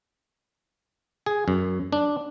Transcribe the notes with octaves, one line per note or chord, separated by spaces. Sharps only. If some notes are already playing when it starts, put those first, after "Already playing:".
G#4
F#2
D4